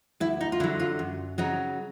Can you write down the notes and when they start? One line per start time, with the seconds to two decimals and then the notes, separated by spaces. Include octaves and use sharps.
0.20 D2 E4
0.41 D#4
0.52 F4
0.60 D3 E4
0.64 F#3
0.80 F4
0.99 F#2
1.38 C#3 F#3 D#4